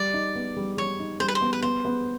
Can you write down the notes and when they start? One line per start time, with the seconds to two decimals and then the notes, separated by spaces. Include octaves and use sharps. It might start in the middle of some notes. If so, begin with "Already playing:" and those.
Already playing: G3 D5
0.14 D#4
0.35 B3
0.57 G3
0.77 G3 C#5
1.00 D#4
1.20 G3 C5
1.28 B4
1.35 C5
1.41 B3
1.53 B4
1.62 B3 C5
1.85 B3